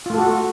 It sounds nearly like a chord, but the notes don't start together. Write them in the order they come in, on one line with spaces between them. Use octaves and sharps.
F4 A3 A4 F#4